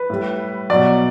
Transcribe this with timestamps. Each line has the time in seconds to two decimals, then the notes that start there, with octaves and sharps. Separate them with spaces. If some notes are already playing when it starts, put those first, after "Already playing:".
Already playing: B4
0.10 A2 G3
0.70 B2 F#3 D5